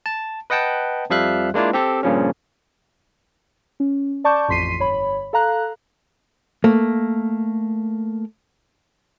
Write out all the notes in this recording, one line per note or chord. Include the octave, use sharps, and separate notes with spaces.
A5
B4 D#5 F#5 G5 A5
F2 F3 G3 E5 F5 F#6
G#3 A#3 D4 E4 F4
C4 G4 A4
G2 A#2 C#3 F3 C#4
C#4
D5 A5 C#6 D6 G6
A1 F2 C6 B6 C7 D#7
G1 C#5 B5
A4 F5 A#5 F#6
A3 A#3